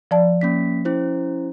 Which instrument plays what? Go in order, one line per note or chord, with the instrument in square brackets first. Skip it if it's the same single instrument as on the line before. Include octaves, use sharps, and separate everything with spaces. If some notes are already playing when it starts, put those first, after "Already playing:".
[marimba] F3 D5 A5
[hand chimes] A#3 C#4 B6
C#4 E4 C5